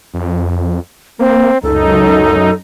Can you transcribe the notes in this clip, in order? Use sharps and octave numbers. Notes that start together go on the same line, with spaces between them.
F2
A#3 C4
C#2 F#2 D#4 A4